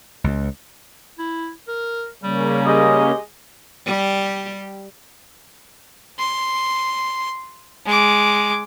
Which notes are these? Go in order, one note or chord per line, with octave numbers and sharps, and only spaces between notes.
C#2
E4
A#4
C#3 G3 A#3 C#4
G#3 G4 D#5
G3 G4
C6
G#3 D6